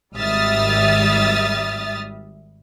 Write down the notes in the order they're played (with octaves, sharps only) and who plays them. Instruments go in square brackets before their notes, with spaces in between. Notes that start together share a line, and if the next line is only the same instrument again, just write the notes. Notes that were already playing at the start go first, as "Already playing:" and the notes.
[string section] G#1 G3 E5 D#6 F6 A6